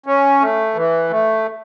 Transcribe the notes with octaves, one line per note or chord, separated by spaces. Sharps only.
C#4
A3
E3
A3